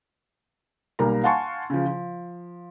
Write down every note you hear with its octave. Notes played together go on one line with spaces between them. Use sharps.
B1 G3 A#3 A#4 A#5
F5 F#5 G#5 A5 C6 C#6
C#3 F3
F3